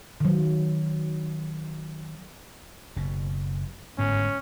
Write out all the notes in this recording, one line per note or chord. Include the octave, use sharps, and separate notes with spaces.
D#3 F#3
F#1 B2
G1 G#2 B3 C#4